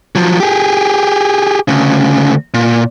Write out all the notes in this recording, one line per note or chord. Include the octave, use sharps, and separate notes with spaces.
F3 F#3
G4 G#4
D2 C#3
A#2